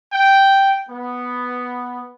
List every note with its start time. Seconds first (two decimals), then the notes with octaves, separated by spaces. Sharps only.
0.12 G5
0.90 B3